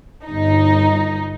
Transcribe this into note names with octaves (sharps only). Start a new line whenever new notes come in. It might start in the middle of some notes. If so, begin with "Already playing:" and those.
G1 D#4